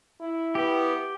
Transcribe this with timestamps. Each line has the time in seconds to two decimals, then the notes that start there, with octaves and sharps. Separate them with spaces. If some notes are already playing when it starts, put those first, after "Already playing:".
0.21 E4
0.55 B3 G4